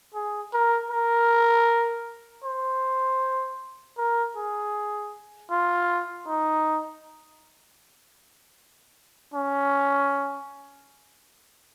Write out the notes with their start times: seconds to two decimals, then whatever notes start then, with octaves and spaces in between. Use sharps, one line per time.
0.15 G#4
0.53 A#4
0.91 A#4
2.44 C5
3.98 A#4
4.36 G#4
5.51 F4
6.27 D#4
9.34 C#4